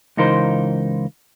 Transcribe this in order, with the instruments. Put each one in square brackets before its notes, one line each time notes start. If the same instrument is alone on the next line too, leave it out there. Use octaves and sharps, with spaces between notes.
[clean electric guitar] C#2 E3 D#4 F4 A#4 C5